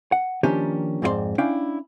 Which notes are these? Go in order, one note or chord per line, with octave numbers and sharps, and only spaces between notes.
F#5
D#3 F3 A#3 C#4 D4 G4
F2 G#2 C4 F4 D5 C6
C#4 D4 E4 F5 G5